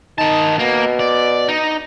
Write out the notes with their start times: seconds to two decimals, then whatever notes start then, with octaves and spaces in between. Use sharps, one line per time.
0.18 D#3 D#4 A5
0.59 B2 A#3
0.99 D5
1.48 D#4